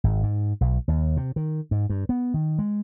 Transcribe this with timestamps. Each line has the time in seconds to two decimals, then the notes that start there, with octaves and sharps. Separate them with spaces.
0.04 G#1
0.23 G#2
0.61 B1
0.88 D#2
1.17 C3
1.36 D#3
1.71 G#2
1.90 G2
2.09 B3
2.34 D#3
2.59 G#3